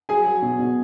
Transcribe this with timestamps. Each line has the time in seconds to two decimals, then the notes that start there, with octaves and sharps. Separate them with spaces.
0.09 F#3 G#4 G#5
0.27 F#3
0.42 B2
0.59 B2